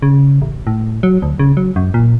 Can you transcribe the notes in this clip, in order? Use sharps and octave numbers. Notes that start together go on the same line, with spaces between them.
C#3
A1
A2
F#3
D2
C#3
F#3
F#2
A#2